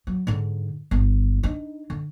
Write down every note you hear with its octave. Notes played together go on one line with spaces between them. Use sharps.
F#3
G#2 D3
G1
D4 D#4
D3